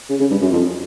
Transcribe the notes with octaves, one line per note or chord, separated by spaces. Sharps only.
C#3
C#3
G2
F#2
F2